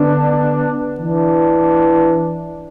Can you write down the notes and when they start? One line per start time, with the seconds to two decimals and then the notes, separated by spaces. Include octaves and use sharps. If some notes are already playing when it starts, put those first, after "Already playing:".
Already playing: D3 B3 D4
0.99 E3
1.04 D4